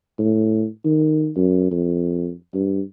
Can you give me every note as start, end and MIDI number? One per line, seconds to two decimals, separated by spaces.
0.19 0.66 45
0.85 1.31 51
1.36 1.69 42
1.71 2.32 41
2.54 2.81 43